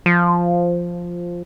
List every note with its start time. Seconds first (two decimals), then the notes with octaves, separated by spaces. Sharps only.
0.06 F3